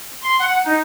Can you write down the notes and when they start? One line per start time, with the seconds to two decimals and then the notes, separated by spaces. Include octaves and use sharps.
0.23 C6
0.40 F#5
0.65 D#4